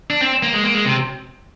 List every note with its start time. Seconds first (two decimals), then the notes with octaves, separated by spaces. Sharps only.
0.10 D4
0.21 C4
0.43 A#3
0.54 G#3
0.64 A#3
0.74 G#3
0.85 C3